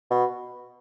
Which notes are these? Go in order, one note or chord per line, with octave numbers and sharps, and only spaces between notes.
B2